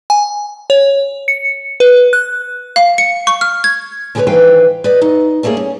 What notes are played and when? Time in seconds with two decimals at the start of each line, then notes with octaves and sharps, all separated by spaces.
0.10 G#5
0.70 C#5
1.28 C#7
1.80 B4
2.13 F#6
2.76 F5
2.98 C#7
3.27 C#6
3.41 F6
3.64 G#6
4.15 D3 C#4 G4 A#4 B4 C#5
4.27 D#3 E3 B4 C5 F5 G5
4.84 B4 D5 D#5
5.02 D#4
5.43 G3 A3 A#3 C#4 G#4
5.57 C#4